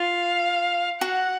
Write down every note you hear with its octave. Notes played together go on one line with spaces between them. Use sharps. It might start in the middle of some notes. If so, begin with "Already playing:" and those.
Already playing: F4 F5
F#4 F#5